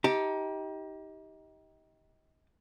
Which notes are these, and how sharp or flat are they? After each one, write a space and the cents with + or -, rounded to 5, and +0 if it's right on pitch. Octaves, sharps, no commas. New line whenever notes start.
D#4 +30 G4 -5 A5 +45